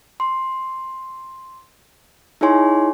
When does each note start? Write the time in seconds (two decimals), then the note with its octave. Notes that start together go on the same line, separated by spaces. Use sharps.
0.20 C6
2.41 D#4 E4 G#4 C#5 G#5 C6